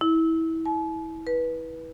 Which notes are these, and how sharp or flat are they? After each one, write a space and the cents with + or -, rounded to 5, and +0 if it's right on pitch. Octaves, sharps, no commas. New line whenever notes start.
E4 -25
A5 -45
B4 -20